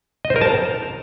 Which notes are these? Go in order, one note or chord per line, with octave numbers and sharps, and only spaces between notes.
D#5
C5
A#4
A5
A#5